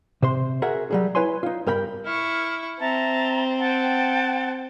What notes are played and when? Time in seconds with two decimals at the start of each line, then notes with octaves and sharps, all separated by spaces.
0.22 C3 C5 C6
0.62 F#4 G#4 A#4 E5 F#5
0.91 F#3 G3 G#4
1.15 E4 B4 C#5 G#5 C6
1.43 D#4 F4
1.67 G2 A#4 G5 B5
2.05 E4 C#6 F6
2.80 C4 E5 A5 A#5
3.61 F#5 G5 A5